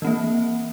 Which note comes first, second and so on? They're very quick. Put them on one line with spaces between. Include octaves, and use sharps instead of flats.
E3 C4 A#3